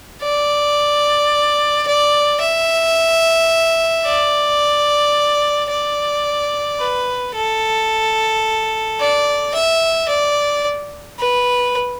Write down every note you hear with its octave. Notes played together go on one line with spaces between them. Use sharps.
D5
D5
E5
D5
D5
B4
A4
D5
E5
D5
B4